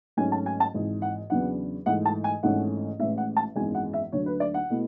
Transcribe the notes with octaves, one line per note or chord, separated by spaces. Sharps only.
G#1 G#2 F#3 A3 C#4 G#5
A5
G#5
A5
G#1 G#2 E3
F#5
E2 C#3 F#3 B3 D4 F#5
G#2 E3 A3 F#5
A5
G#5
G#1 G#2 E3 A3 C#4 F#5
A1 A2 G#3 E5
F#5
A5
G#1 F#2 E3 G#3 B3 G#5
F#5
E5
D2 D3 F#3 C#5
B4
D5
F#5
B2 A3 E4